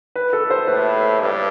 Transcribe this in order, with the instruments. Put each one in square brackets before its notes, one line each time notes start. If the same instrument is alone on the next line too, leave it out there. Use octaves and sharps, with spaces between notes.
[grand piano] B4
A4
C5
[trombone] A2 [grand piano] B4
[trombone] G2